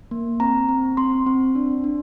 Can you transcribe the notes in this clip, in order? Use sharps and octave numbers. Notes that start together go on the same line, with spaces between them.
A#3
C4 A#5
C4
C4 C6
C4
D4
D4